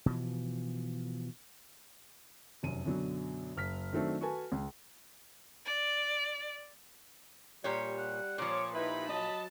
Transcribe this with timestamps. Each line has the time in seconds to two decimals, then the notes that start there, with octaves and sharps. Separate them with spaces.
0.06 B2 E3 F3
2.63 F1 F#2 D#7
2.86 F#2 B2 D3 F#3
3.57 F#1 F6 B6
3.93 D#3 F#3 A3 C4 D4
4.21 F#4 A4 B4 G#5 A5
4.52 C#2
5.65 D5
7.64 A#2 G3 G4 C#5
7.98 F#5
8.38 A#2 F3 C#5 D6
8.74 D#4 E4 G4 B4 B5
9.09 F#3 D#5 A5